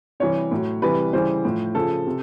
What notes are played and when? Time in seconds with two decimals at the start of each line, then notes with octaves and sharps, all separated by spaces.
0.20 C3 E3 G3 C#5
0.51 A2 F#3
0.82 C3 E3 G3 B4
1.13 C#3 E3 G3 C5
1.45 A2 F3
1.75 C#3 F3 A4
2.07 C3